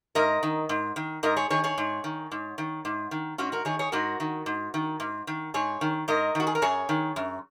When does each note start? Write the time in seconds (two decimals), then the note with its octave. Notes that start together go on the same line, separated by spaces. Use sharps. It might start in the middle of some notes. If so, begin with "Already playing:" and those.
0.15 G#2 A#4 D#5
0.43 D#3
0.69 G#2
0.96 D#3
1.23 G#2 A#4 D#5
1.36 G#4 C#5
1.50 D#3 G#4 C#5
1.64 G#4 C#5
1.78 G#2
2.04 D#3
2.31 G#2
2.58 D#3
2.85 G#2
3.11 D#3
3.38 G#2 C#4 F#4
3.52 F#4 A#4
3.65 D#3 G#4 C#5
3.79 G#4 C#5
3.92 G#2 F#4 A#4
4.20 D#3
4.46 G#2
4.74 D#3
5.00 G#2
5.27 D#3
5.54 G#2 G#4 C#5
5.81 D#3
6.08 G#2 A#4 D#5
6.35 D#3 F#4
6.47 G#4
6.55 A#4
6.62 F#2 G#4 C#5
6.89 D#3
7.16 F#2